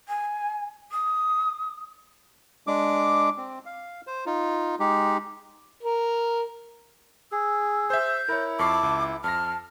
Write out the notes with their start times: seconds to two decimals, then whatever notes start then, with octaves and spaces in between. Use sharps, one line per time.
0.08 G#5
0.91 D#6
2.67 G#3 D4 D6
3.37 C4
3.66 F5
4.07 C5
4.26 D#4 F4
4.80 G#3 D#4 G4
5.83 A#4
7.32 G#4 E6
7.90 C5 E5 G6
8.29 E4 A#4 C#5
8.59 F2 A5 C#6 D6 C7
8.83 C#2
9.24 F2 A5 F6 A#6